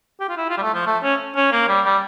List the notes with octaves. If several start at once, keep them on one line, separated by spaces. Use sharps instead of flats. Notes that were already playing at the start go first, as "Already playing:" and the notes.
G4
F4
E4
F4
G3
A3
F3
A3
C#4
C#4
A#3
G3
G3